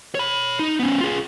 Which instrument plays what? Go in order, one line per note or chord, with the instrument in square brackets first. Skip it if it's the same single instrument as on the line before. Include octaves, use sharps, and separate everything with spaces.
[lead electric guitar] C#5 B5
D#4
B3 C#4
F4 G#4